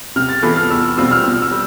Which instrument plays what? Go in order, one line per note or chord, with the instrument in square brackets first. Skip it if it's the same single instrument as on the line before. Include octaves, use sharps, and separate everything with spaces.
[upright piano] C3 [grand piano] F6
[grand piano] A6
[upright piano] E3 B3 F4 A4
[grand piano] F6
[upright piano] E2 [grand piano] E6
[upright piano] B2 G3 C4 F4 [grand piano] E6
[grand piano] F6
[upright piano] B2 [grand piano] E6
[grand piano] E6
[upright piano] G3